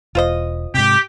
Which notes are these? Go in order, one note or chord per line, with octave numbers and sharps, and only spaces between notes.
E1 F4 C5 D#5
G#2 C3 G4